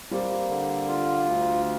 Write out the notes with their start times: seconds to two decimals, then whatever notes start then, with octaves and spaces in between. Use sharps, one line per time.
0.11 G3 A#3 C4
0.49 D3
0.88 F4
1.26 D2